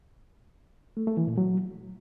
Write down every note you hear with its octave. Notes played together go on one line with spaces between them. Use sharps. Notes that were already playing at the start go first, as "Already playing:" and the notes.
A3
A3
E3
A#2
F#3